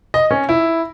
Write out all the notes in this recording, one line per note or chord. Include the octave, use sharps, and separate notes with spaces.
D#5
C#4
E4